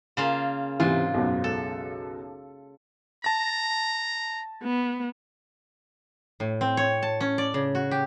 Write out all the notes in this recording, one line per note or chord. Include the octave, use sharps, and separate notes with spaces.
C#3 A#3 F4
G#2 C3 E3 F4
B1 F#2
A4
A5 A#5 A#6
B3
A2
C4
C#5
A5
C#4
D5
C#3
F#4
G4